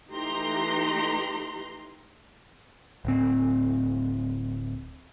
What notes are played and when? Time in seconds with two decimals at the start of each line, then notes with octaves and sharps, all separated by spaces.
0.12 E3 A3 D#4 G4 A#5 C6
3.05 D1 C4